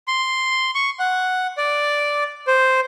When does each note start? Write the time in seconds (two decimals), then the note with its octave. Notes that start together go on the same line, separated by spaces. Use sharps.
0.08 C6
0.75 C#6
0.99 F#5
1.57 D5
2.47 C5